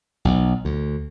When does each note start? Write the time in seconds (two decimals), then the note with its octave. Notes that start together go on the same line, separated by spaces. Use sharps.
0.25 B1
0.65 D2